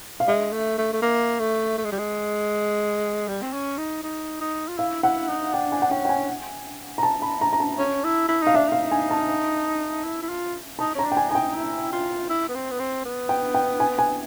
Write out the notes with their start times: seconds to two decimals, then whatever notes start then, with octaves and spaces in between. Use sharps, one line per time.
0.20 F5
0.28 G#3 E5
0.52 A3
0.78 A3
0.93 A3
1.02 A#3
1.39 A3
1.78 A3
1.85 G#3
1.92 G3
1.99 G#3
3.28 G3
3.42 C4
3.53 C#4
3.78 D#4
4.03 D#4
4.41 D#4
4.68 F4
4.78 E4 F5
5.03 E4 F#5
5.28 D#4
5.53 D4 G5
5.72 G#5
5.82 F#5
5.90 C#4 G5
6.05 G5
6.09 G#5
6.98 A#5
7.03 A5
7.22 B5
7.41 A#5
7.53 A#5
7.60 A5
7.78 C#4
8.04 E4
8.28 E4
8.42 D#4 F5
8.54 D4 E5
8.68 D#4 F5
8.91 G#5
9.11 A5
10.04 E4
10.22 E4
10.29 F4
10.79 D#4 A5
10.95 C#4 A#5
11.04 D4
11.12 G5
11.17 G#5
11.29 D#4 G#5
11.35 G5
11.55 E4
11.92 F4
12.29 E4
12.49 B3
12.55 C4
12.71 B3
12.79 C4
13.05 B3
13.29 G5
13.54 G5
13.80 G#5
13.99 G#5